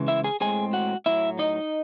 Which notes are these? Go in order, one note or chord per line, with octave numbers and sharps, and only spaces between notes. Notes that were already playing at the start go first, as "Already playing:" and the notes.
Already playing: C#3 E3 G#3
E4 E5
G#4 G#5
A2 G#3 C4 G#4 G#5
F#4 F#5
A2 F#3 C4 E4 E5
D#4 D#5